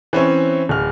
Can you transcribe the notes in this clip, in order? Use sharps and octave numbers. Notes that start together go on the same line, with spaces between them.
E3 C4 C#4 C#5
D1 F6